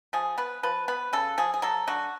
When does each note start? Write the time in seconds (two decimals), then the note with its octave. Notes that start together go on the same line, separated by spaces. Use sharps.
0.13 F3 G#4
0.38 B3 B4
0.63 F3 B4
0.88 B3 B4
1.13 C#3 A4
1.38 F3 G#4
1.54 G#4
1.62 F#3 A4
1.87 D3 F#4